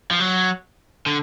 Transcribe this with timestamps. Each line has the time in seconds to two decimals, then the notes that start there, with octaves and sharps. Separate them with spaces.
0.11 F3
0.20 F#3
1.06 D3